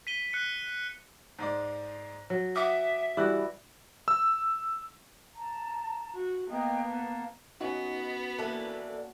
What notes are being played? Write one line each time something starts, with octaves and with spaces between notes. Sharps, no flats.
B6 D#7 G7
F#6 C#7
G#2 G#3 D5
F#3
E5 F#5 D6 D#6
E3 G3 E4 F#4 D5 F#6
E6
A5 A#5
F#4
A#3 B3 D#5 G5 D#6
F#5 A5
B3 C#4 D#4 F#4
E3 A#3 D4 A4